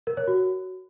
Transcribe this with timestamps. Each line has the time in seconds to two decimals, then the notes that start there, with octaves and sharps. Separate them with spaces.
0.07 A#4
0.17 C#5
0.27 F#4